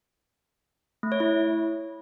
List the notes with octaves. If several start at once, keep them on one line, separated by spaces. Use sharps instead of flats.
A3
C#5
E4